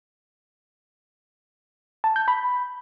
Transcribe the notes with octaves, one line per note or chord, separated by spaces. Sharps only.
A5
G6
B5